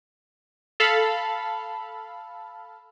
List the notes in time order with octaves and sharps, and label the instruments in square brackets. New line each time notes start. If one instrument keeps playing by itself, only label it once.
[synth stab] A4 F5 B5